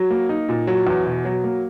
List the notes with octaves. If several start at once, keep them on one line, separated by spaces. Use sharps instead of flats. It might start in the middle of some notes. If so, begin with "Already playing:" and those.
Already playing: F#3
A#3
D#4
A#2
F#3
E2
B2
F#3
A#3